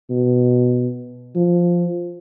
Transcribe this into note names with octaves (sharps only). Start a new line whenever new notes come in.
B2
F3